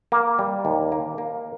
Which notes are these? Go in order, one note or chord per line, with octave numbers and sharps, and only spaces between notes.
A#3
G3
D#2
A#3
A#3